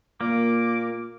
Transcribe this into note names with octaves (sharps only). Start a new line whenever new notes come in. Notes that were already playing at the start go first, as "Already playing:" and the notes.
A#2 A#3 D6